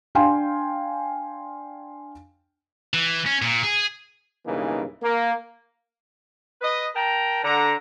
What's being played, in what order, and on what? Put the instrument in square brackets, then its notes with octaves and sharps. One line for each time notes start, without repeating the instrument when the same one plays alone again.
[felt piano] D4 F5 G5 G#5 C6
[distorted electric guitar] E3
C#4
A#2
G#4
[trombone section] B1 G2 C#3 E3 A#3 D#4
A#3
[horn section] B4 D#5
A#4 G5 A5 A#5
D3 A#5